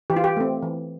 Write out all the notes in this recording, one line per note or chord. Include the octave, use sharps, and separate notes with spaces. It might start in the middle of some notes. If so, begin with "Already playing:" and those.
E3 G4
F4
G4
A3 C4
E3